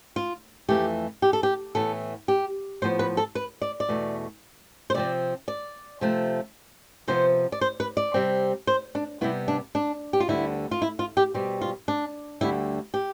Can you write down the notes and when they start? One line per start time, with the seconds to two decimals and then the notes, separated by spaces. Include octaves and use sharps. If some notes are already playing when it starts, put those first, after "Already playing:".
0.16 F4
0.69 F2 E3 A3 G4
1.22 G4
1.33 A4
1.43 G4
1.75 A2 E3 B3 A4
2.28 G4
2.82 A2 F3 B3 C5
2.99 B4
3.17 A4
3.35 B4
3.62 D5
3.80 D5
3.88 E2 B2 A3
4.90 C5
4.94 C3 F3 C4 D5
5.48 D5
6.01 C3 F3 A3
7.08 C3 F3 B3 C5
7.52 D5
7.61 C5
7.80 B4
7.97 D5
8.14 C3 G3 C4
8.67 C5
8.95 D4
9.21 C3 G3 B3 E4
9.48 D4
9.75 D4
10.13 G4
10.20 F4
10.28 D2 D3 G3 B3 E4
10.71 F4
10.82 E4
10.99 F4
11.17 G4
11.34 B2 G3 C4
11.61 F4
11.88 D4
12.41 D2 D3 G3 E4
12.94 G4